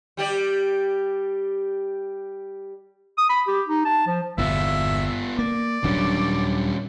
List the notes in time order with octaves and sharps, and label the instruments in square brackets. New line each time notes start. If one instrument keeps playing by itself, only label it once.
[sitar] G3 G4 D5
[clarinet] D#6
B5
G4
D#4
A5
F3
[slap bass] G1 E2 A#2 [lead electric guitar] B3 F4 [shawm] E5
[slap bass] A#3 [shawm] D5
[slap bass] D#1 F#3 D4 [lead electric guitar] G3 C#4